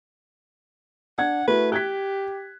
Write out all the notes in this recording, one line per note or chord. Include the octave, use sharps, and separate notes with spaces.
D4 F#5 G#6
A3 E4 F#4 B4
G4 F#6 G#6 B6